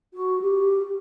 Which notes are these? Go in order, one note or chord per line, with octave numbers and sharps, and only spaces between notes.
F#4
G4